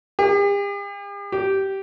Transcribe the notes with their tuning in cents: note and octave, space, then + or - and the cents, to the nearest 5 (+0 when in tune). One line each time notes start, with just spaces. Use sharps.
G4 +45
G4 -15